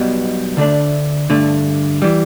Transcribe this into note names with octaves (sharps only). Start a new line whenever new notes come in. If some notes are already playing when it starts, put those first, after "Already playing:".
Already playing: B1 B2 G3 B3
D2 D3 A3 D4
G2 D3 A3
E3 G3